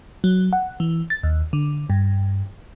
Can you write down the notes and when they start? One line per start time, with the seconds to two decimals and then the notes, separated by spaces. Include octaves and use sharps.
0.24 F#3
0.53 F#5
0.80 E3
1.10 A6
1.23 D#2
1.53 D3
1.90 G2